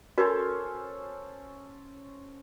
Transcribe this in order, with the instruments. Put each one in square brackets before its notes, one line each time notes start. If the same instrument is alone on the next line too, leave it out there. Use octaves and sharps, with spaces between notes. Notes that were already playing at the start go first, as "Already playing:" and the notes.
[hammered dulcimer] C#4 A4 C5 [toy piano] F#4 A#4